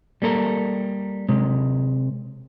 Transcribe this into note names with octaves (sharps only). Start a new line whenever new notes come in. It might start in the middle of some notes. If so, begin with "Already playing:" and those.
G3 A#3 A4 A#4
C3 G#3